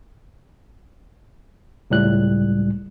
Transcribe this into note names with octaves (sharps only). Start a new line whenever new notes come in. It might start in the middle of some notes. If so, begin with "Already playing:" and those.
C#2 A2 G3 F#6